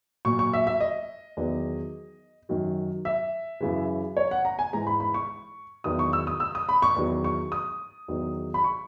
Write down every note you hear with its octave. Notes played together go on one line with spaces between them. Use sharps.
A#2 F#3 C#6
C#6
E5
E5
D#5
E2 D#3 F#3
F#2 D#3 F#3
E5
F#2 C#3 E3
C#5
F#5
A#5
G#5
G#2 E3 A#5
B5
B5
C#6
E2 D#3 F#3 D#6
C#6
E6
D#6
E6
D#6
B5
C#6
E2 D#3 F#3
C#6
D#6
E2 D#3 F#3
B5
C#6